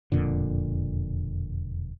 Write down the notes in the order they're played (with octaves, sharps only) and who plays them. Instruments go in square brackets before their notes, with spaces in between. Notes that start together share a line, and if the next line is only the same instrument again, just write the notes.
[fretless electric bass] E1 F2 A#2 D3